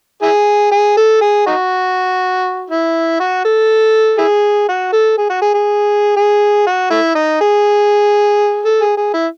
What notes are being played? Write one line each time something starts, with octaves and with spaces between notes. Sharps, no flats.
E4 G#4
G#4
A4
G#4
D#4 F#4
E4
F#4
A4
E4 G#4
F#4
A4
G#4
F#4
G#4
G#4
G#4
F#4
A3 E4
D#4
G#4
A4
G#4
G#4
E4